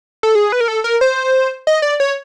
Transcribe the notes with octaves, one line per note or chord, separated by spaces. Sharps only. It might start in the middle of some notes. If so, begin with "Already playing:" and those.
A4
G#4
B4
A#4
A4
A#4
C5
D#5
D5
C#5